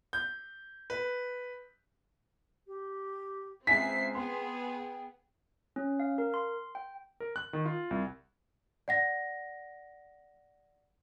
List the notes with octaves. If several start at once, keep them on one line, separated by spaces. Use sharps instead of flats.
G6
B4
G4
C#2 C4 E5 G#5 B6 C7
B3 G#4 G5 C6
C#4
F5
A#4
C6
G5
A#4
F#6
D#3
F4
C2
D5 F#5 A#6